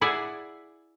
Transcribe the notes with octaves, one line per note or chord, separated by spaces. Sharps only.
E4 G#4 D5 F#5 G#5